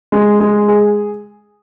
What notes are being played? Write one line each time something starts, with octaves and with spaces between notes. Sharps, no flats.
G#3
G#3
G#4